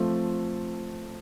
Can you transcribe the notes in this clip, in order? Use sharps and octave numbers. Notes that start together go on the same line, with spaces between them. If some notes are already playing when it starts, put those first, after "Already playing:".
Already playing: F3 A3 C4